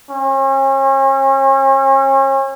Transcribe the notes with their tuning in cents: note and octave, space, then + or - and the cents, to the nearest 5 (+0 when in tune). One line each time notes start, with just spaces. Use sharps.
C#4 -40